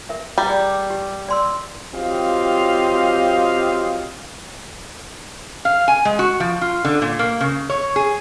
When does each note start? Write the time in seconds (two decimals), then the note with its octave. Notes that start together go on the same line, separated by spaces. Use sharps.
0.09 A#4 E5
0.38 G3 D#5 A#5
0.49 G#4 D5 D6
0.90 G4
1.28 D5 C6 E6
1.94 F#3 C4 F4 G4 D#5 F5
5.65 F5
5.88 G#5
6.05 G#3
6.19 F#4
6.40 F3
6.61 F4
6.85 D3
7.02 A#2
7.19 A#3
7.40 C#3
7.70 C#5
7.96 G#4